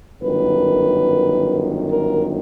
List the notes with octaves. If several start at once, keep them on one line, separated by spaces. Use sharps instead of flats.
G1 F#2 D#3 B4
A#4